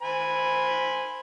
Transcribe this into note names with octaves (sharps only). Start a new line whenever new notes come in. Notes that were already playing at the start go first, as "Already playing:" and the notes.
C5 G#5 B5